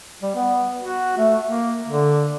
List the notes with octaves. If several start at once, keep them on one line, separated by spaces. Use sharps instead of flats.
G3
B3
F#4
A3
A#3
D3